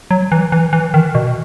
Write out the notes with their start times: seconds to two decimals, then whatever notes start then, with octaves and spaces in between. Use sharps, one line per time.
0.11 F#3
0.32 E3
0.52 E3
0.73 E3
0.94 D#3
1.15 B2